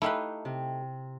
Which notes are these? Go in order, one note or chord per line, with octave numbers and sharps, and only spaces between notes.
A3 D#4 E4 G4 B4 F5
C3